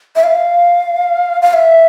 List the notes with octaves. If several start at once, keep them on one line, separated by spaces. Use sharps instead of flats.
E5
F5
F5
E5